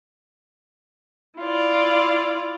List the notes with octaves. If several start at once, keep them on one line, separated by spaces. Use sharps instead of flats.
E4 F4 D5